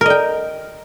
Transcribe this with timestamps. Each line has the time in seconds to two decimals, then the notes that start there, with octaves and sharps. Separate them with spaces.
0.01 A#4
0.06 D#5
0.10 G5